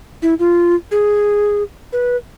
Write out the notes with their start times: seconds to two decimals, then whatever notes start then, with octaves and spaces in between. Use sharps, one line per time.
0.22 E4
0.39 F4
0.91 G#4
1.93 B4